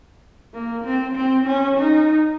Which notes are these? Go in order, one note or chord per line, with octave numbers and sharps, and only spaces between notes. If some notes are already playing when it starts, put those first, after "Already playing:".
A#3
C4
C4
C#4
D#4